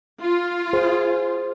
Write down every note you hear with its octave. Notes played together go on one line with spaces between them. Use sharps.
F4
G#4 C5